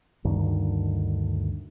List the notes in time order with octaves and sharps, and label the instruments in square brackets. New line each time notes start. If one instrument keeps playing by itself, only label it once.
[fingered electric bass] D2 G2 D#3 D4